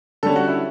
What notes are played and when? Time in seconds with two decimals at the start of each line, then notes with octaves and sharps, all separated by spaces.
0.23 D3 G3 C#4 A4
0.36 F#4
0.47 E4